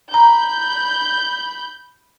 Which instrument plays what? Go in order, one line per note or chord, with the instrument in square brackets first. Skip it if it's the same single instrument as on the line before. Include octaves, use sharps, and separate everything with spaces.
[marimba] A#5 [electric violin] B5 [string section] G6